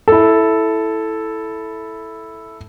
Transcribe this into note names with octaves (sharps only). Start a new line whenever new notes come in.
E4 A4